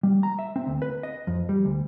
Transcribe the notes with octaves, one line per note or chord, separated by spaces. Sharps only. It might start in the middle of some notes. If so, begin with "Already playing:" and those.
G3
A#5
E5
C4
D2
B4
D#5
F2
G3
D2